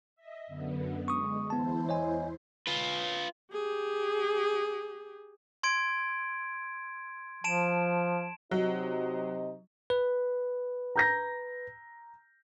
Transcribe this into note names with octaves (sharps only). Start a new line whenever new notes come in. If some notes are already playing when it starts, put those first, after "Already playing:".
D#5 E5
F#2 D3 B3
G#3 C#6 D#6
E2 B3 E4 C5 A5
C#5 D#5 G#5
F4 B4
G4 G#4
C6 G#6 D7
F3 A5 D7 E7
C3 F#3 D#4 D#5
B4
A#5 G6 A#6